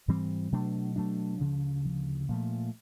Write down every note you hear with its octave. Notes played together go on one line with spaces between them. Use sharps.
G#2 E3 G3 C4
B2 F#3 A3 D4
B2 F#3 A3 D4
D2 C#3 F3
D2 C#3 F3
A#2 F3 A3